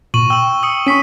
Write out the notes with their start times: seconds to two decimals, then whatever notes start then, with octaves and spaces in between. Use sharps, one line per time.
0.14 A#2 C#6 D#7 F#7
0.30 G5 E6 F#7
0.63 D#6 C#7
0.87 C#4 C#6 B6 D#7